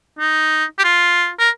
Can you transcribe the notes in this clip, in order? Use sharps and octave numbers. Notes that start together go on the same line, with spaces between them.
D#4
G4
F4
A#4